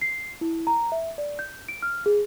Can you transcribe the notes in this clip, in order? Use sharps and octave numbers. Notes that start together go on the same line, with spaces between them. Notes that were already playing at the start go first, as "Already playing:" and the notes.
C7
E4
A#5
E5
D5
G6
D7
F6
G#4